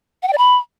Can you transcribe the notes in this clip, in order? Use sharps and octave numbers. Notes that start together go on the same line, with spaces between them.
F#5
G5
D5
B5